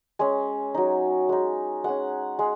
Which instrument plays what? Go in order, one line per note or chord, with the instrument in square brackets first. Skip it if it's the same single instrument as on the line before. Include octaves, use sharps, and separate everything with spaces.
[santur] G#3 C#4 G#5
F#3 D#4
G#3 D#4
G#3 C#4 F#5
G#3